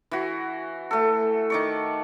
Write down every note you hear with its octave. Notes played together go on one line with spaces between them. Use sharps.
E3 F#4
A3 A4
D#3 D5 C#6